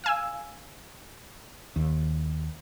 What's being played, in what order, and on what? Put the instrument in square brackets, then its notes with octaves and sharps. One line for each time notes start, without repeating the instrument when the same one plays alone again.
[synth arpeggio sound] F5 G#5 E6
[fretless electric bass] D#2